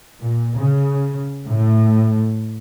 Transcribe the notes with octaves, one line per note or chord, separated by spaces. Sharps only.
A#2
C#3
A2